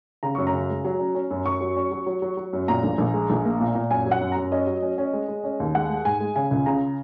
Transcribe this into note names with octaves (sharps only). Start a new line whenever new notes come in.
C#3 A#5
F#2 C#6
A#5
C#3
G#3
F#3
C#4
C#4
F#2
F#2 C#6
F#3
C#4
F#3
F#3
F#3
F#3
F#2
A#2 A#5
A#1
A#1
G#3
A#1
A#3
A#2
A#2
F#2 G#5
F#3
F#5
F#2
F#2 A#5
C#4 D#5
F#3
C#4
C#4
G#3
G#3
C#4
D#2
G#3 F#5
G#3
G#2 G#5
G#3
C#3 G#5
C#2
C#3 A#5